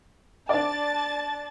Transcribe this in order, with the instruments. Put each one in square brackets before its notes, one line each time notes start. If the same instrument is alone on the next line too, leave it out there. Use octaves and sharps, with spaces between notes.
[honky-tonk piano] D4 D5 [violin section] A5 A6